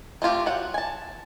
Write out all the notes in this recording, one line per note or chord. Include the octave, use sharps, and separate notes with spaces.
A3 C4 F4 G4
F#3 F#5
G#5 A5